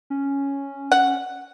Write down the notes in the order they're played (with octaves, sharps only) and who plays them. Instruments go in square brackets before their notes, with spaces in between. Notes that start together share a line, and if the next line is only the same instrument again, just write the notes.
[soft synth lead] C#4
[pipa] F#5